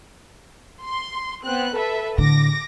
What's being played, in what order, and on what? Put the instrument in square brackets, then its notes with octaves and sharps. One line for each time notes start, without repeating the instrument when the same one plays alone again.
[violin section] C6
B3 C4 F#6
A4 B4 E5
[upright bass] A2 D3 [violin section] D6 A#6